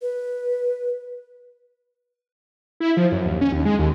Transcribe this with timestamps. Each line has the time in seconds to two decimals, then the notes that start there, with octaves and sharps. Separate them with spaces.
0.02 B4
2.80 E4
2.97 F3
3.12 F#2
3.25 D#2
3.41 C#4
3.53 D#2
3.65 G#3
3.79 D#2